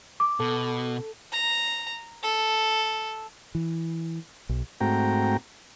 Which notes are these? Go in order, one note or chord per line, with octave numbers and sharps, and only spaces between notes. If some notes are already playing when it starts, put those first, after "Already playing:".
D6
B2 A4
A#5
A4
E3
B1
G#2 A3 C4 F#4 G5 A#5